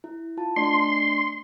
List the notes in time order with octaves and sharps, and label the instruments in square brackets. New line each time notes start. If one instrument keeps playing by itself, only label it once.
[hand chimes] E4
F4 A5
[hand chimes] A3 D4 D5 [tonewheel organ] C6